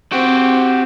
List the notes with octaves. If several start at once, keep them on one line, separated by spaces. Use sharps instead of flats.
C4 F#4 G4